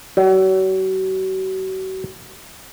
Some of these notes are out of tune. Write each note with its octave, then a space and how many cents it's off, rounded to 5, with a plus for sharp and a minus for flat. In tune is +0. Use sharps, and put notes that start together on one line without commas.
F#3 +40